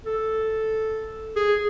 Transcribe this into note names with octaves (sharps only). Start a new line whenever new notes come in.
A4
G#4